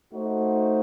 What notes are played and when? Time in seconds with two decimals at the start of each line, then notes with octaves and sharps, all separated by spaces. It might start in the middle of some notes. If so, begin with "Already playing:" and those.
0.12 A3 D#4 F#4 C5